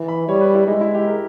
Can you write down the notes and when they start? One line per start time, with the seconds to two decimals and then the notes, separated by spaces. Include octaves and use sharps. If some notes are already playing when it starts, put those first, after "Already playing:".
Already playing: E3
0.08 B5
0.29 G3 C#5
0.41 B4
0.55 E4
0.67 G#3 D#4
0.81 E4
0.94 G4
1.07 A#4